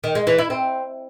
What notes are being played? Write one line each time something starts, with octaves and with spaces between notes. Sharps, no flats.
D#3
G#3
E3
E4
C4